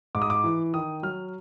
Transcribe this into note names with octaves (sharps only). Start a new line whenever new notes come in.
G#2 D6
D#6
D6
E3
D#3 D#6
F#3 F6